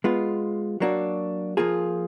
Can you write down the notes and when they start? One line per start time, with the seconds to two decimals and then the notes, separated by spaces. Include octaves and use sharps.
0.04 G#3 B3 F4
0.80 F#3 A#3 D4 F#4
1.57 F3 A#3 F4 G#4